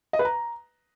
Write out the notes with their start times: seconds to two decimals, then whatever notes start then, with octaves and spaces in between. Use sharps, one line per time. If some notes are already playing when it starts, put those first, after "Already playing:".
0.13 D#5
0.19 B4
0.25 A#5